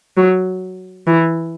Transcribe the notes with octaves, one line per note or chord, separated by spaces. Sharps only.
F#3
E3